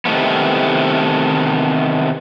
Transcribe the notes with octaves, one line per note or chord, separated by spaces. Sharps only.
C3 D#3 E3 A3 B3